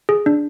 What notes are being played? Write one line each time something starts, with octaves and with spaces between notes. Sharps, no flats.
G#4
D4